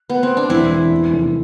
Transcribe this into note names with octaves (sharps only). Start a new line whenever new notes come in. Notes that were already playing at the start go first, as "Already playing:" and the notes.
Already playing: A3
B3
C4
D4
E1 C4 E4
E3
E2
F1